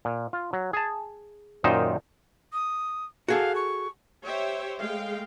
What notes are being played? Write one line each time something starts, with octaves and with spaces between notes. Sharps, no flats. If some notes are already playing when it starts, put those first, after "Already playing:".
A#2
F4
F#3
G#4 A5
F#2 A#2 D#3 D#4 C5
D#6
F#4 G#4 A4 F5
C#6
G4 C5 C#5 E5 G5
G#3 A3 F5 G5